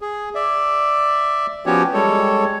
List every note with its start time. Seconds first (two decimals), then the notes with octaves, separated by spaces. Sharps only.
0.01 G#4
0.35 D5 E5
1.66 F3 B3 C#4 F#4 G4 C#5
1.94 G3 G#3 A4 C#5